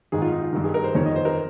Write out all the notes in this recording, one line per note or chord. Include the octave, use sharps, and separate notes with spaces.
G#2 D#3 G#4
F4
D#4
F4
G2 D#3 G4
G#4
A#4
C5
F2 D#3 C#5
D#5
C5
A#4